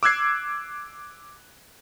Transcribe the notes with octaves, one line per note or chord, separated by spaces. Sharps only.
D6 E6 F#6 G#6 C7